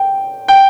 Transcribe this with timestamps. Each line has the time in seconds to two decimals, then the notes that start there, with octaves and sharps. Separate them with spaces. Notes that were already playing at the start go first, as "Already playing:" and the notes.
Already playing: G5
0.48 G5